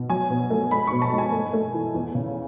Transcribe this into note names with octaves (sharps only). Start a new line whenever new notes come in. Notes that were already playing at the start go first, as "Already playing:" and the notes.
Already playing: B2
F#3 G#5
B2
A3
G#3 B5
B2 C#6
A5
G#3
G#5
A3
A3
E3
E2
C#3